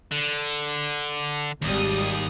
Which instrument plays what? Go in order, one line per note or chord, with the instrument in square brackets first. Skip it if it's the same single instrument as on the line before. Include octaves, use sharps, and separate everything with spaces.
[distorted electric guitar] D3
[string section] G#1 G3 D#6 [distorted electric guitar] D#2